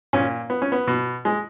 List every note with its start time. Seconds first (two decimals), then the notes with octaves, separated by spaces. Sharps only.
0.13 A#2 C#4
0.50 B3
0.62 C#4
0.72 B3
0.87 B2
1.25 G#3